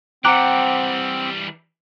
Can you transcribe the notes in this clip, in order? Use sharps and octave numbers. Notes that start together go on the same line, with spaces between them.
E3 G3 C4 F#5 G5 A#5 D6 F#6